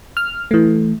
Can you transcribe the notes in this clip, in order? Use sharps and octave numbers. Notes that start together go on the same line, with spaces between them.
F6
E3 A3